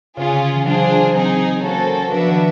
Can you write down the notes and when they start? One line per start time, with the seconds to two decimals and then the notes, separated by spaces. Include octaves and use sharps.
0.17 C#3 C#4 F4 G#4
0.29 D3
0.53 E3
0.66 F#3 D4 F4 G#4 C5
1.15 F#3 C4 D#4 G#4
1.63 A#3 C#4 F#4 A4 C5
2.12 F3 B3 D4 F#4 B4 E5
2.28 D#3